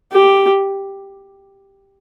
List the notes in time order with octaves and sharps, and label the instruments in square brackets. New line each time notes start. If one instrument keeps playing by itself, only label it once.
[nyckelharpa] G4